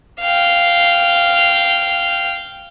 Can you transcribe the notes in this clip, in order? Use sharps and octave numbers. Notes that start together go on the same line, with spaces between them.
F5 G5